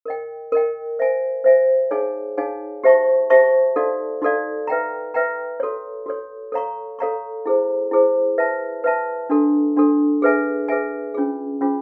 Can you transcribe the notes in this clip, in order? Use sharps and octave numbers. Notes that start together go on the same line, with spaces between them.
A#4 D#5 G5
A#4 D#5 G5
C5 E5 G#5
C5 E5 G#5
D#4 G#4 C#5 F5 G#5
D#4 G#4 C#5 F5 G#5
G4 C5 E5 A5 C#6
G4 C5 E5 A5 C#6
D#4 F#4 A4 D5 F5
D#4 F#4 A4 D5 F5
B4 E5 G5 A#5
B4 E5 G5 A#5
F#4 A4 C#5
F#4 A4 C#5
A4 C#5 F5 A#5 C#6
A4 C#5 F5 A#5 C#6
E4 G#4 C5
E4 G#4 C5
B4 E5 A5
B4 E5 A5
D4 F#4 A4
D4 F#4 A4
G#4 B4 E5 G#5
G#4 B4 E5 G#5
C#4 F4 G#4
C#4 F4 G#4